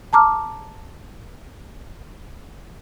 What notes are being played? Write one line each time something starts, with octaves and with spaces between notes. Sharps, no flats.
A5 A#5 D6 F6